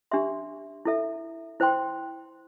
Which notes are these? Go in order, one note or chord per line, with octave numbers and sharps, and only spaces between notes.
D4 G4 E5 C6
E4 A4 E5
E4 C5 G5 C6